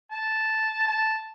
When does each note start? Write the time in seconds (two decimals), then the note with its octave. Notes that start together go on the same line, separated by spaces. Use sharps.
0.12 A5
0.87 A5